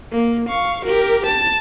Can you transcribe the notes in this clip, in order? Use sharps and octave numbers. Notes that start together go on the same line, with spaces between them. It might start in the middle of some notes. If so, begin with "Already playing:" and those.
A#3
F5 C#6
G4 A#4
A5